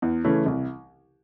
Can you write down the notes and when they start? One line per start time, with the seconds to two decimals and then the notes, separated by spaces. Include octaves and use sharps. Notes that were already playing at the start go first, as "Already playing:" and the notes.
0.02 E2
0.24 C#3 E3 A3 C#4
0.46 C2